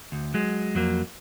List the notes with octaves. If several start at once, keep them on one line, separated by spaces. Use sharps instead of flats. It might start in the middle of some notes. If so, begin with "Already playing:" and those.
D2
F#3 G#3
F2 F#3 A#3